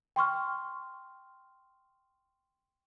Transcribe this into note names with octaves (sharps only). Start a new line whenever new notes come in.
G5 C6 C#6 F6